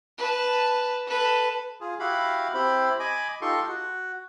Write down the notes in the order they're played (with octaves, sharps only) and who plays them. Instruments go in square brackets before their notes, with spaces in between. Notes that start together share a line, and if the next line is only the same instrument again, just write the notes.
[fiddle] B4 A5
A4 B4
[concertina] F4 G#4
E4 F#4 G4 F5 B5
C4 E4 G4 C5 B5
D#5 G#5 B5 D6
D#4 F4 G4 A4 C6 C#6
F#4